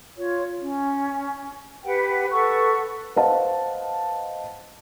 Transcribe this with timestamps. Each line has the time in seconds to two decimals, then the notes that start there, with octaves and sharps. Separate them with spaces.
0.17 F4 C#5
0.61 C#4
1.85 G4 B4 F#5 G5
2.31 A4 B4 F#5 C#6
3.16 B4 C5 D#5 F5 F#5 A5